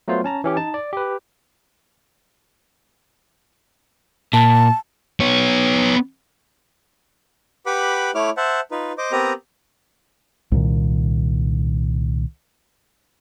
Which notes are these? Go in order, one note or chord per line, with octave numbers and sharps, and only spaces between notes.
F#3 A3 B3 F4 C5
C#4 A5 A#5
E3 C#4 G4
D#4 A5
D5
G4 B4
A#2 A5
B3 C#5
G4 B4 F#5 B5 D6
A3 E4 C#5 D6 F6
C5 E5 F#5 A5
D#4 F4 B4
C5 D#5 D6
B3 C4 G4 A#4 A#5 D#6
C2 A#2 D#3